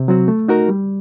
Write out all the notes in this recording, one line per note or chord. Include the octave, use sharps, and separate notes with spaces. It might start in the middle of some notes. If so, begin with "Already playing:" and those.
Already playing: C3
F#3 C4 F#4
A3
D#4 F#4 A#4
G3